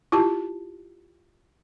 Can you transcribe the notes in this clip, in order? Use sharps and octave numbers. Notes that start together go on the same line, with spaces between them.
E4 F4 G4 A5